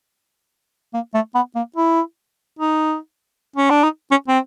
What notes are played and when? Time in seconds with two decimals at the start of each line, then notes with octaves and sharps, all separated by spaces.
0.94 A#3
1.14 A3
1.35 B3
1.55 A#3
1.76 E4
2.59 D#4
3.56 C#4
3.70 D4
3.84 D#4
4.11 C#4
4.28 C4